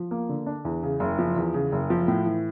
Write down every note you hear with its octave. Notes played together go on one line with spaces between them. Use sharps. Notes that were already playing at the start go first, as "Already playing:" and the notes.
Already playing: F3
A#3
D3
D4
E2
C#3
F#1
F3
E2
C#3
F#1
F3
A2
E3